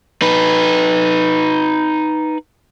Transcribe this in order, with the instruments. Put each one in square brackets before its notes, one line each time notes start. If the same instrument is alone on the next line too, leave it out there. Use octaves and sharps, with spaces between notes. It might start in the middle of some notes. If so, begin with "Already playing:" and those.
[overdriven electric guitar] D#4 B4